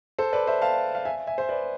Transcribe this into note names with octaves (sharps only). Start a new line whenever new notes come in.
A4 C5
B4 D5
C5 E5
F5 A5
F5
E5 G#5
E5 G#5
C5 E5
B4 D5